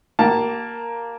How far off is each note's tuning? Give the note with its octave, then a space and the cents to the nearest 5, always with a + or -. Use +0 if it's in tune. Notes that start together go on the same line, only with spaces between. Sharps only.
A#3 +0 G4 -40 A5 +0